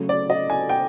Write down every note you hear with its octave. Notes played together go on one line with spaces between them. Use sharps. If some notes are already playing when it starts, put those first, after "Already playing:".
Already playing: C#3 F#3 A3
D5
D#5
G#5
G5